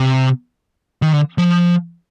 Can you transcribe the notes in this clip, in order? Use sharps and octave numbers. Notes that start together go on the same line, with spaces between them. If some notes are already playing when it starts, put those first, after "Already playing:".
Already playing: C3
D#3
D3
F3